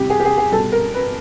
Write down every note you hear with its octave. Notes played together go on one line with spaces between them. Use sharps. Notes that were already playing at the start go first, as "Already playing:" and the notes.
Already playing: E2 C3 E3 G3 G4
G#4
G4
G#4
G#4
B2 G3 A4
A#4
B4